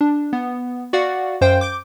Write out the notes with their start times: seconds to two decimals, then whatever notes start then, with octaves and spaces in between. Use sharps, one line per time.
0.01 D4
0.33 B3
0.93 F#4 D5 F5 F#5
1.41 F#2 C5 F5 G5 G6
1.61 D6 G6 D7